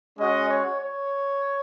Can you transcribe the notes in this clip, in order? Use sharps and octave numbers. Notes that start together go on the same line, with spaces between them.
G#3 C#4 F#4 D#5
C#5
C#5